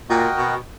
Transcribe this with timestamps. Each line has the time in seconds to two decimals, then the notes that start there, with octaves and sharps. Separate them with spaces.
0.09 A#2 F#4 A#4 D#5 G5
0.38 B2